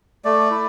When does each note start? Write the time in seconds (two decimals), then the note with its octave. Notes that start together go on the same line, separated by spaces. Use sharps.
0.25 A3 D5
0.51 E4